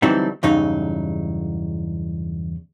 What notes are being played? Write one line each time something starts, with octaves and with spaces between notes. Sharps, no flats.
D3 E3 F#3 G3 C4 D#4
E2 G2 C#3 F#3 D#4